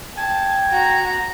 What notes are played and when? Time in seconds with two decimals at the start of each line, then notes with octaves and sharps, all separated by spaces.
0.17 G5 A5 G#6
0.72 F#4 A#5